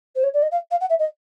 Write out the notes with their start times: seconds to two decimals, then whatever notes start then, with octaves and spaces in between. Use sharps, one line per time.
0.15 C5
0.23 C#5
0.33 D5
0.42 D#5
0.51 F5
0.70 F5
0.80 F#5
0.89 E5
0.99 D#5